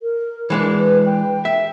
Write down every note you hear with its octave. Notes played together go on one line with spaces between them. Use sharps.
A#4
E3 G#3 D4
B4
G5
E5